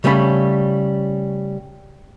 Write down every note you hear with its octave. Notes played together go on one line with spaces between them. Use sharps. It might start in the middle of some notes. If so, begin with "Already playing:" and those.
C#3 G3 A3 C#4 D#5 B5